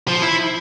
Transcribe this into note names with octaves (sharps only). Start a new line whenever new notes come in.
F3
E4